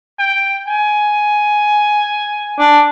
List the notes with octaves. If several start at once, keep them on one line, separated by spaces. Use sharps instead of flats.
G5
G#5
D4